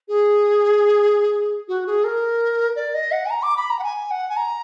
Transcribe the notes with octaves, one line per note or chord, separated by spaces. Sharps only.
G#4
F#4
G#4
A#4
D5
D#5
F#5
G#5
A#5
D6
B5
A#5
F#5
G#5
F#5
G#5
A#5